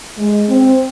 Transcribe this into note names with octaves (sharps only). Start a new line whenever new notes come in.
G#3
C4